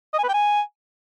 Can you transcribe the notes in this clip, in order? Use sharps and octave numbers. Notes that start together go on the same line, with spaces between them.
D#5
G#5
B4
G5
G#5